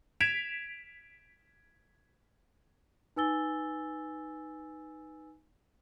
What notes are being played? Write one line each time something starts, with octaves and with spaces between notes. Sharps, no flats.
G#6 B6 D7 E7 F7
D#4 B4 G#5 E6 A6 G7